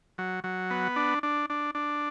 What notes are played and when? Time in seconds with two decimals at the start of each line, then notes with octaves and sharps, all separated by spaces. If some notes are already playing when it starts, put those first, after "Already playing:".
0.18 F#3
0.44 F#3
0.70 B3
0.96 D4
1.23 D4
1.50 D4
1.75 D4